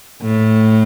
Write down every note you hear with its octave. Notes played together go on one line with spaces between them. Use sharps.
A2